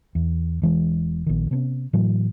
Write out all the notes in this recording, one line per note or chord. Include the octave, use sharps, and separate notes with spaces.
E2
E1 E3 G#3
A#1 D#3
C3 B3 C#4
A2 E3 F#3